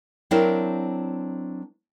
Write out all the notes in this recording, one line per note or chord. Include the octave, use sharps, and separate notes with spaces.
F#3 C4 D4 E4 A#4 E5